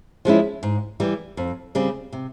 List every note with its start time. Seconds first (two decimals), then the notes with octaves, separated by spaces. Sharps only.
0.25 F3 G#3 C#4 E4
0.63 G#2
1.00 E3 G3
1.37 F2
1.75 C#3 G3 C4
2.13 C3